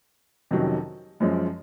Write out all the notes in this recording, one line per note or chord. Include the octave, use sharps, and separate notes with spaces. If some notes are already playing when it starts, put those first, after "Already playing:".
F2 C3 D#3 F#3 C#4
F#2 F3 G#3 C#4